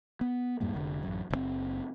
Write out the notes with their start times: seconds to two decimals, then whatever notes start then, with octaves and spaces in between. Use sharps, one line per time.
0.21 B3
0.61 F2 G#2 G3 A#3
0.74 F1 D3
1.03 A1 F#2
1.30 F#1 C#3 C4